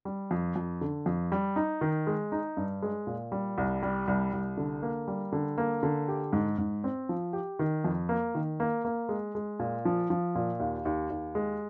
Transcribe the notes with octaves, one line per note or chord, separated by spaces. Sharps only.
G3
F2
F2
D3
F2
G3
D#4
D#3
G#3
D#4
G2
G#3
A#2
G3
C2
G3
C2
C2
D3
A#3
G3
D3
A#3
D3
G4
G#2
G#2
C4
F3
G4
D#3
F2
A#3
D#3
A#3
A#3
G#3
G#3
A#2
F3
F3
A#2
D#2
D#2
D#2
G#3